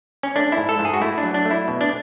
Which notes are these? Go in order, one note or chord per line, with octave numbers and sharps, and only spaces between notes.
C#4
A3 D4
G#2 E4
A4
G#2
G#4
F#4
A3 E4
D4
F#3
D4
A3
E4
B2
D4